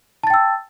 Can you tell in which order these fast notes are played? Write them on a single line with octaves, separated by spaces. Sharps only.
A5 A6 G5 E6